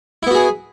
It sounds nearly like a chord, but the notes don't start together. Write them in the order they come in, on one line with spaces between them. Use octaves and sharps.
E4 B3 F#4 G#4